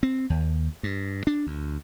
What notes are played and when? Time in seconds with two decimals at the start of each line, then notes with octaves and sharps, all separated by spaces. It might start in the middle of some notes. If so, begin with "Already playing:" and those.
0.03 C4
0.30 D#2
0.83 G2
1.27 D4
1.47 D2